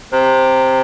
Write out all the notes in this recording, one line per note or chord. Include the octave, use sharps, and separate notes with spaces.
C3